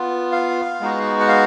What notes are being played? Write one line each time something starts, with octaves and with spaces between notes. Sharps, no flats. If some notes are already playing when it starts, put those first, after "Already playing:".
Already playing: B3 F4
F5
G#3 B3 D#4 F#4
F#5
F5